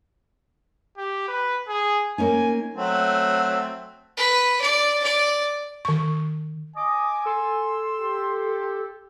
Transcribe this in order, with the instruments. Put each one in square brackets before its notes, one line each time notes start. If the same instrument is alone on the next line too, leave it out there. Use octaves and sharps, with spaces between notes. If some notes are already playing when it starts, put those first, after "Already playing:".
[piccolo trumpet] G4
B4
G#4
[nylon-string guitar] A#3 C#4 D#4 [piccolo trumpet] G#5
[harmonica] F#3 A3 C4
[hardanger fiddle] B4
D5
D5
[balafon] D#3 C#6
[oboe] D#5 [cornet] G#5 [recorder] D6
[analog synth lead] A4 [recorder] C6 [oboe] E6
[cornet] G4